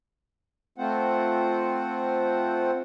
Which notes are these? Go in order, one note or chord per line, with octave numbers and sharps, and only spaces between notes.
A3 C4 F4 C5 F#5